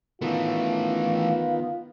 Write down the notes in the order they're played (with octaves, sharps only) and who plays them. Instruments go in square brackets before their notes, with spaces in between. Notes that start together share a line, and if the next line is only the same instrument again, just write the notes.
[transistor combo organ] D#3 B3 [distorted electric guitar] E3 A3 [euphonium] F4